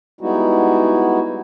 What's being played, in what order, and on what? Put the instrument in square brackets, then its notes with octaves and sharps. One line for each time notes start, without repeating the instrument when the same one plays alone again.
[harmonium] G3 G#3 B3 D#4 E4 F#4